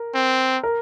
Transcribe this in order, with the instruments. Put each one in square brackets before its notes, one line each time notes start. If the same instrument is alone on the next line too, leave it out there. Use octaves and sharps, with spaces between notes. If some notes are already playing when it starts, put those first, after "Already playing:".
Already playing: [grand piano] A#4
[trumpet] C4
[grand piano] A#4